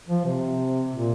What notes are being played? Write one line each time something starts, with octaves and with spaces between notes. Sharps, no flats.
F3
C3
A#2